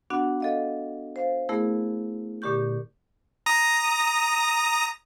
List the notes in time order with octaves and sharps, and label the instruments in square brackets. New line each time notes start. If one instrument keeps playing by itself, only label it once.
[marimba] B3 D4 F#4 F#5
A4 D#5 F5
C5 F5
A3 B3 E4 G#4 A#4
A#2 D3 G4 C#6 G6
[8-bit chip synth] A#5 D#6 A#6